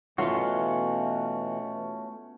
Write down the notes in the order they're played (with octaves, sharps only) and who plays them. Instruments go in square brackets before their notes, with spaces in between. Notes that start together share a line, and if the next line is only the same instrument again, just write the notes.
[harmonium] B2 E3 [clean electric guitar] A3 C#4 F#4 [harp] B3 F4